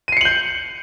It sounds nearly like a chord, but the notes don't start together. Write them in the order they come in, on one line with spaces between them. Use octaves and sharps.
D#7 C7 C#7 F#7 G6